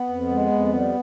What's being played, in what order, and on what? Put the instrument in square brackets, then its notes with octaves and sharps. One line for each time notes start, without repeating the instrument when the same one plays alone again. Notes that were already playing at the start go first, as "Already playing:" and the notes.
Already playing: [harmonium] B3
F2
G#3
F2
G3